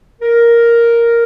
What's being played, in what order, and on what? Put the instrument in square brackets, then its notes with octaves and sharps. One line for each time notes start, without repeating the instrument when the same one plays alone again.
[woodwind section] A#4